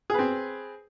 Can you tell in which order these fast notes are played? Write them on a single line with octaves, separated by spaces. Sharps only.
G#4 B4 C4